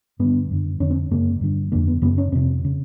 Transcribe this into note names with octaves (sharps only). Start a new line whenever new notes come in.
G2 D3 B3
F#2 D3
F2 D3 C#4
C4
F#2 C#3 A#3
G2 D3
F2 D3 A#3
B3
F#2 C#3 B3
C#4
F2 C3 C4
C#3